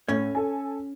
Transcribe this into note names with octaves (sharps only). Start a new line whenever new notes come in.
A2 C#4 C#5
A4 G#5